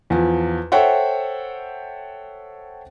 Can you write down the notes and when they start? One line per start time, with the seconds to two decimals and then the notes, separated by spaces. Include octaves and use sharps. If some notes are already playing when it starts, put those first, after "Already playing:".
0.10 E2 F3
0.72 A4 C5 C#5 E5 F#5 G5